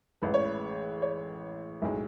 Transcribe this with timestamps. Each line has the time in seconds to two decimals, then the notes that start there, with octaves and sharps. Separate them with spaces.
0.22 A1 A2 G#3 B4
0.34 C#5
0.45 B4
1.02 C#5
1.82 B1 A2 G#3